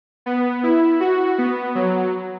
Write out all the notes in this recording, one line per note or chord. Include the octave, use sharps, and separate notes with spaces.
B3
E4
F#4
B3
F#3